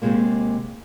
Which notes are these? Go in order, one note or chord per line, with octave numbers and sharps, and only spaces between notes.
D#2 A2 C3 G#3 A#3